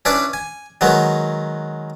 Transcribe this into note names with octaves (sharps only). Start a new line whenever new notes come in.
C#4 D4 E4 B4 D5
G#5
D#3 F#3 G#3 B3